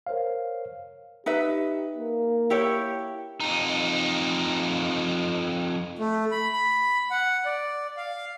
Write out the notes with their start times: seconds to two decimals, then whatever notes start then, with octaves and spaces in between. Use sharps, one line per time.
0.07 A#4 C5 C#5 F5
1.26 D#4 G4 B4 E5
1.94 A#3
2.50 E4 G4 C#5
3.40 F2 D#4
5.99 A3
6.31 B5
6.53 B5
7.11 F#5
7.45 D5
7.97 F5